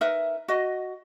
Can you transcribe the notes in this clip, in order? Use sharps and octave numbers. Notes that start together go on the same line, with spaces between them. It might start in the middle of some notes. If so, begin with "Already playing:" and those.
D#4 A#4 B4 E5
F#4 D#5